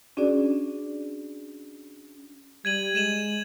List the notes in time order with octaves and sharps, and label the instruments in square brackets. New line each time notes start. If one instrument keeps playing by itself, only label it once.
[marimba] C#4 D4 F#4 G#4 D5
[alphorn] G3 [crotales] G#6 D#7 F#7
[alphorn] G#3 [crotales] D#7 E7 F#7